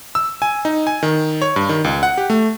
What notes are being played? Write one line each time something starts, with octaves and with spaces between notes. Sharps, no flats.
E6
G#5
D#4
G#5
D#3
C#5
G2
D#3
C#2
F#5
G4
A3